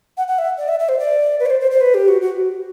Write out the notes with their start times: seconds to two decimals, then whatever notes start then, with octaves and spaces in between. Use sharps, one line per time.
0.17 F#5
0.28 F#5
0.39 E5
0.58 D5
0.68 E5
0.80 E5
0.89 C5
0.99 D5
1.40 B4
1.46 D5
1.50 C5
1.61 C5
1.71 C5
1.81 B4
1.94 G4
2.08 F#4
2.21 F#4